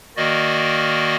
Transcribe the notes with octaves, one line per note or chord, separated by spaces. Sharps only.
D#3 A#3 F#4 D5 D#5